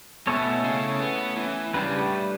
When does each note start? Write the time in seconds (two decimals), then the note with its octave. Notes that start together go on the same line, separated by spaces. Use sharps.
0.27 B2 A3 C#4 E4 A4 C#5
0.65 C#3
1.00 B3
1.37 E3
1.74 C#3 G3 D4 G4 B4
1.99 A2